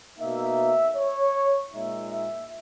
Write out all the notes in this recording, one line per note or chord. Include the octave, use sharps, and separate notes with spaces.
B2 A#3 D#4 E5
C#5
A#2 G#3 D#4 E5
E5